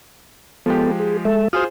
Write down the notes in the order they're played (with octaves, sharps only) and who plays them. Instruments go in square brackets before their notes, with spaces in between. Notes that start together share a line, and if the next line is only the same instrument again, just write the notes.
[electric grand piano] F3 G#3 G4 [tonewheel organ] B3 A4
[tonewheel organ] G#4
G#3 A4 E5
[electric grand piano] F4 G#4 C5 [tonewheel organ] F#4 D#6 F6